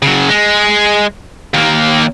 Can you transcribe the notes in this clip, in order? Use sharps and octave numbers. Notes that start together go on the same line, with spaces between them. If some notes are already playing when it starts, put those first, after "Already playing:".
C#3 F#3
G#3
D#2 A#3